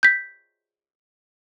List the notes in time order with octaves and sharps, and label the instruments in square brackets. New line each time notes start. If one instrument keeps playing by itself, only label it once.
[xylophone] G6 B6